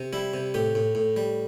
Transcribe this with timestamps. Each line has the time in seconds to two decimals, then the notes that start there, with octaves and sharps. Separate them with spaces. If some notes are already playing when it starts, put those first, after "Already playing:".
Already playing: C3
0.13 G3 E4
0.34 C3
0.54 A2 G4
0.75 A2
0.95 A2
1.17 G3